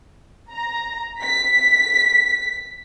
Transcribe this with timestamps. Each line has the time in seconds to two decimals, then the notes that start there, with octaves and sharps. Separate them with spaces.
0.50 A#5
1.21 B6